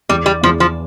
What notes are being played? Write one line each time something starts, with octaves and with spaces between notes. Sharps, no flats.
E2 G3
G3
E2 F3
F3